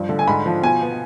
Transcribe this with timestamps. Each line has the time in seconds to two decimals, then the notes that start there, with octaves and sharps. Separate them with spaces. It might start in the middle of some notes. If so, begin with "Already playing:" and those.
Already playing: G2 F3
0.09 D3
0.19 G#5
0.27 G#2 B5
0.46 F3
0.63 B2 G#5
0.81 B3